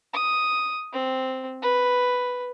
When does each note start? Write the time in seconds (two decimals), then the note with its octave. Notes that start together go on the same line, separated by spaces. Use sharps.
0.14 D#6
0.93 C4
1.62 B4